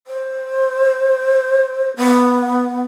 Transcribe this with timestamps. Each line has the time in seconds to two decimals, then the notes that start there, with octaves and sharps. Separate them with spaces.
0.07 C5
1.97 B3